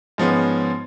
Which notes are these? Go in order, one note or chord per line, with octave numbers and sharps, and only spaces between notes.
G#2 F3 B3 C#4